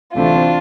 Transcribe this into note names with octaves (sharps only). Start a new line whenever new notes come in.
D2 C3 E3 A3 C4 D4 F4